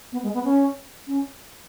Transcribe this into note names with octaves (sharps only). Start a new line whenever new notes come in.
B3
G#3
B3
C#4
C#4